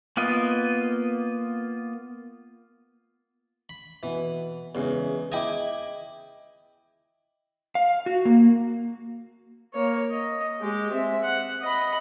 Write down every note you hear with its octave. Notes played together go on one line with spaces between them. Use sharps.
A#3 B3 F4 D#5
B5
B2 E3
E2 C#3 G#3
E4 D#5 G5 G#5 D6
F5
F#4
A#3
A#3 C#5
D#5
G#3 G4
C4 E5
F#5
D#5 B5